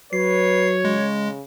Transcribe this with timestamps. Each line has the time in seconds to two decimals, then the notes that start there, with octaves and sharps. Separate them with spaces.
0.13 F#3 B4 C#5 C7
0.85 C#3 G#3